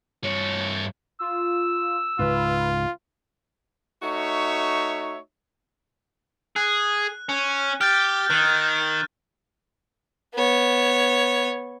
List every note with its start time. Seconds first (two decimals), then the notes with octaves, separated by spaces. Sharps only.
0.24 G2 C#5
1.20 F4 E6
2.19 C#2 G#2 F4 B4
4.03 A3 D#4 F#4 C#5 E5
6.56 G#4 F#6
7.29 C#4
7.81 G4 F6 G6 A6
8.30 D#3 F#6
10.35 B3 C#5